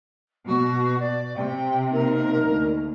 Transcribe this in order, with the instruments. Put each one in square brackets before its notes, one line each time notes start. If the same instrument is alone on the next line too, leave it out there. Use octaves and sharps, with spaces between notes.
[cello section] B2 [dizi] F#4
[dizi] D5
[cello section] C3 [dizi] G5
[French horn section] A#3 D#4 [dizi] A#4
[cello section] D2